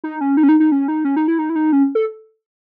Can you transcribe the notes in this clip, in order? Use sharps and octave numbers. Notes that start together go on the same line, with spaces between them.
D#4
C#4
D#4
C#4
D#4
D#4
C#4
D#4
C#4
D#4
E4
D#4
E4
D#4
C#4
A4